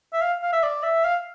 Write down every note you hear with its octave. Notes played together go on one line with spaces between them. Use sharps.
E5
F5
F5
E5
D5
E5
F5